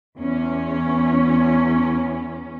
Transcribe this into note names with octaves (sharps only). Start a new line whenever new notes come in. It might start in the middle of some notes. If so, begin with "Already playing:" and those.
E2 C#4